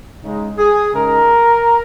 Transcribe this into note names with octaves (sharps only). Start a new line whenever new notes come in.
C#3 G#3 D#4
G#4
C#3 G#3 D#4 A#4